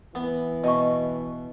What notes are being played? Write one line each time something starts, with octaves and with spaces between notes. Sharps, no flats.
E3 B3
B2 D#5 C#6